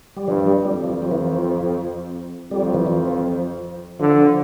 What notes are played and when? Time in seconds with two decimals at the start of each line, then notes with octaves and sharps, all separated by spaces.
0.17 G3
0.28 G2 F3
0.47 G3
0.65 F2 G3
0.84 F3
1.02 F3
1.11 E3
1.21 F3
2.51 F2 G3
2.62 F3
2.74 E3
2.87 F3
4.00 D3 F3